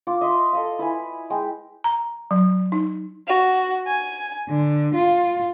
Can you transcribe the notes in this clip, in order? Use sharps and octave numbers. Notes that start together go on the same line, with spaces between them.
F4 D6
D#5 E5 C6
A4 D#5 F5
E4 B4 G#5
G#3 G5
A#5
F#3
D#4
F#4
G#5
D3
F4